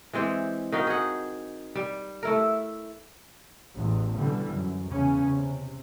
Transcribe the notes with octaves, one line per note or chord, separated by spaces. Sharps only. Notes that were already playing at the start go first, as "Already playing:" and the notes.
E3 G#3 C4 G4
D#3 D#4 F#4 F5
G#4 F#5
G3
A3 E4 A#4
A1 E2
B2 D3 E3 G3
F#2
E2 C#3 C#4
C3